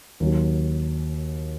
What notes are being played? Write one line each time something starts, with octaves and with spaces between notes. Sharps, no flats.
D#2 D#3 F#3